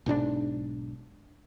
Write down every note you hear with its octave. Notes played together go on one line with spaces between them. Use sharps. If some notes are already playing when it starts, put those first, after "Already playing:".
B1 G#2 C#4 D4